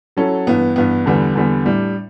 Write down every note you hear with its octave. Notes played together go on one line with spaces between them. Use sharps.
F#3 C#4 E4 A4
G2 E3 B3
G2 E3 B3
E2 D3 G3 B3
E2 D3 G3 B3
A2 G3 D4